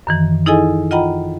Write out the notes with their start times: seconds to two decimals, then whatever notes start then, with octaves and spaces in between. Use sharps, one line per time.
0.07 F#2 D#3 E3
0.46 D#4 E4 G#4 A4 D#5 G#5
0.91 F4 D#5 F#5 G5 A#5 B5